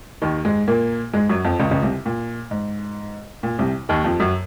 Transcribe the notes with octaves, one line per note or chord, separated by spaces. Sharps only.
D#2 D#3
G#2 G#3
A#2 A#3
G#2 G#3
F#2 F#3
F2 F3
C#2 C#3
C#2 C#3
C2 C3
A#2
G#2
A#2
C2 C3
D#2 D#3
F2 F3
F#2 F#3